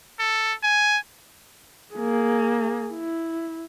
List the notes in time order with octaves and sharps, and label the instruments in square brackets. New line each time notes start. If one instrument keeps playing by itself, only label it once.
[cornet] A4
G#5
[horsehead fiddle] A#3 G#4
E4